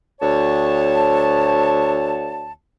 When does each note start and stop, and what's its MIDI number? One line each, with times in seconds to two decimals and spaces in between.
0.21 2.52 38
0.21 2.52 73
0.21 2.52 81